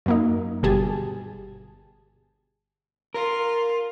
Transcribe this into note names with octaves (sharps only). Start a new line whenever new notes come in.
F#2 A#3 D#4
G1 B2 G4 G#4 G#5 A5
F4 A#4